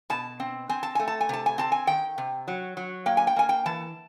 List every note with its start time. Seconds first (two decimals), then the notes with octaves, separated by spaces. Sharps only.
0.10 B2 A5
0.40 C4
0.69 C4 G#5
0.83 A5
0.95 A3 G#5
1.08 A5
1.21 G#5
1.29 C3 A5
1.46 G#5
1.58 C4 A5
1.72 G#5
1.87 D#3 G5
2.18 C3
2.48 F#3
2.77 F#3
3.06 A#3 G5
3.17 G#5
3.27 G5
3.36 A#3 G#5
3.49 G5
3.66 E3 A5